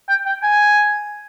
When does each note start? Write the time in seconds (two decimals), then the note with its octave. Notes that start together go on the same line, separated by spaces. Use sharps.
0.09 G5
0.26 G5
0.43 G#5